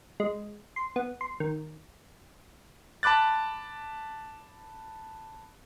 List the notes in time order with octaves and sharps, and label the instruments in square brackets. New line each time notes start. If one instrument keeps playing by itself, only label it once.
[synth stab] G#3
C6
B3
C6
D#3
[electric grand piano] A5 B5 D6 F#6 A6